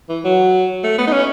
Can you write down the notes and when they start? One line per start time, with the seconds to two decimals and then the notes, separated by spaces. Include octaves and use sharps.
0.09 E3
0.25 F#3
0.83 A3
0.98 B3
1.07 D#4
1.13 C#4